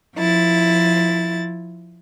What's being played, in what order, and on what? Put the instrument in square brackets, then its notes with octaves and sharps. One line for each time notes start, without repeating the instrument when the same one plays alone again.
[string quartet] F3 E4 A6